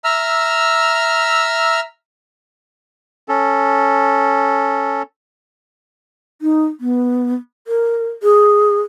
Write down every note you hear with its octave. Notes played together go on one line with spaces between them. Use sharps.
E5 A#5 E6 F6
C#4 A4
D#4
B3
A#4
G#4